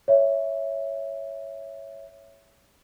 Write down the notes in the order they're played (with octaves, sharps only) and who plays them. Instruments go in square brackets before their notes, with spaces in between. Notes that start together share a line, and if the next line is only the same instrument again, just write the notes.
[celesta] C#5 E5